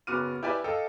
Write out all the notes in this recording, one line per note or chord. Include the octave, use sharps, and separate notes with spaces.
F#1 B3 F#4 D6 F6 D#7
E4 G4 B4 D5 E5 G#5
A4 D#5 F5 G5 A5